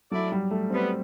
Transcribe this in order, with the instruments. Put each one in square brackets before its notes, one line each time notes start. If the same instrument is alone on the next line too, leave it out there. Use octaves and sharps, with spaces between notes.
[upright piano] F#3 [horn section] A3 E4 A4 D5
[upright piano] G3
A3
[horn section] A2 G3 B3 [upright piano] C4